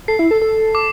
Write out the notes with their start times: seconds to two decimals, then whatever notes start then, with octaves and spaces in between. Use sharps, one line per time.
0.08 A4 C7
0.19 E4
0.31 A4
0.41 A4
0.75 D6